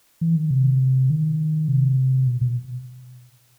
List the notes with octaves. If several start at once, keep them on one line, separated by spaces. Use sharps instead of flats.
E3
D#3
C3
D#3
C3
B2
B2